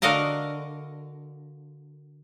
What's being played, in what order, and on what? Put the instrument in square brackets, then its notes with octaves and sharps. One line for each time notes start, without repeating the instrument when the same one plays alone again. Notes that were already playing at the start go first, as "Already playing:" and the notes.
[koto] D3 F#4 A#4 D#5 F5 A#5